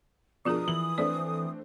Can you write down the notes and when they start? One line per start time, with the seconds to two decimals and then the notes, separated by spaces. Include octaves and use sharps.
0.45 B2 F3 D4 F4 G#4 A#4 D#6
0.68 E3 F#7
0.98 A3 C4 D4 D5